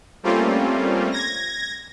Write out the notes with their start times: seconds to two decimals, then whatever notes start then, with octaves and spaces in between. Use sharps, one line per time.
0.23 G3 A3 A#3 C4 C#4 F4
1.12 G#6 A#6